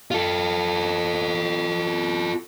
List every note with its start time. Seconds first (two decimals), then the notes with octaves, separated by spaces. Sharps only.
0.11 F4 A4